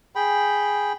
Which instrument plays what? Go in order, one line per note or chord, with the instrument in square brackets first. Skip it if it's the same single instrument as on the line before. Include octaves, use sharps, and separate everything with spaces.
[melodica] G#4 G5 B5